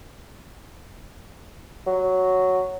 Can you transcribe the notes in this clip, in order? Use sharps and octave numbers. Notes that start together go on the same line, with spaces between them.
F#3